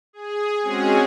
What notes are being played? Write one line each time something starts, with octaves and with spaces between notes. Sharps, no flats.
G#4
G#3 C4 C#4 F#4 G#4